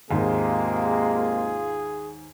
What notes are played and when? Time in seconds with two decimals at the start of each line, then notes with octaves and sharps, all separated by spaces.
0.11 D#2 G#2 C3 G#3 A#3 F4 G#4